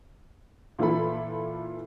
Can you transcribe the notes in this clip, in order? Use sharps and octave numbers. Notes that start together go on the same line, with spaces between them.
A#2 E3 E4 F4 A4 B5